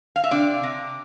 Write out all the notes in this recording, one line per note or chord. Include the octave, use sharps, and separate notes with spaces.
F5
E5
C3 D4 D5
C3